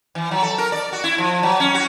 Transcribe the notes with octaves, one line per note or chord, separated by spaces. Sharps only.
E3
F#3
A4
A#4
D5
F#4
E4
F3
F#3
C#4
F#4